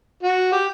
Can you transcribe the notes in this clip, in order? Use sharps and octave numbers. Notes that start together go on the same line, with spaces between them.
F#4
G4